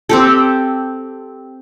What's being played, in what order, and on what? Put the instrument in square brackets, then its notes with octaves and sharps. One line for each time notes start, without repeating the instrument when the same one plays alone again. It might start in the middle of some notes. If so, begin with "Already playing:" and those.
[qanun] C4 G4 A4